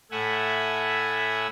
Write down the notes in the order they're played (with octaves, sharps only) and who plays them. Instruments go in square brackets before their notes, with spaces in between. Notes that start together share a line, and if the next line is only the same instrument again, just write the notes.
[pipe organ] A2 A3 E5 F#5 G#5